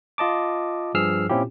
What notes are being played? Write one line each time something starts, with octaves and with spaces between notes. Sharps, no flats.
F4 D#5 A5 D6
G2 F3 G#4 E6 F6 C7
A#2 C4 C#4 E4 F4 G4